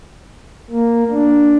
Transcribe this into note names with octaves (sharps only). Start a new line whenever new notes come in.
A#3
D4